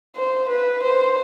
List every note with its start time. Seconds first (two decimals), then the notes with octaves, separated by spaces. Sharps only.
0.16 C5
0.49 B4
0.84 C5